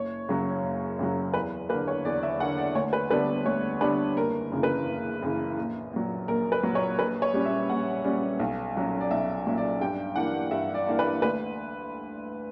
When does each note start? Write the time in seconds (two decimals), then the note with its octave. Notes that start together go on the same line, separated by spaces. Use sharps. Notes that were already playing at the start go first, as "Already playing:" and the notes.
Already playing: F#1 C#5
0.29 F#2 C#3 F#3
0.64 F#1
0.99 F#2 C#3 F#3
1.34 E2 B4
1.69 A#3 B4
1.73 D3
1.88 C#5
2.05 E2 D5
2.23 E5
2.40 D3 A#3 F#5
2.58 D5
2.75 D2 C#5
2.93 B4
3.11 D3 G3 B3 D4 B4
3.46 D2 C#5
3.81 D3 G3 B3 D4 B4
4.17 F#1 A#4
4.52 F#2 C#3 E3
4.63 B4
4.87 F#1
5.22 F#2 C#3 E3
5.57 A#1
5.93 A#2 F#3
6.28 A#1 A#4
6.52 B4
6.63 A#2 F#3
6.75 C#5
6.99 A#1 B4
7.22 C#5
7.34 A#2 G3 C#4
7.45 E5
7.69 A#1 F#5
8.04 A#2 G3 C#4
8.40 B1
8.75 A#2 F#3 C#4
9.01 D5
9.11 B1 E5
9.46 A#2 F#3 C#4
9.58 D5
9.81 G2 G5
10.16 E3 A#3 D4 F#5
10.51 G2 E5
10.75 D5
10.86 E3 A#3 D4
10.99 B4
11.22 D2 B4